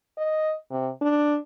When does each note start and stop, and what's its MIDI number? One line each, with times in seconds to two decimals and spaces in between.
0.18 0.54 75
0.70 0.90 48
1.01 1.38 62